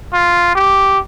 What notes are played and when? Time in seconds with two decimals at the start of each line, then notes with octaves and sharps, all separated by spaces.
0.13 F4
0.55 G4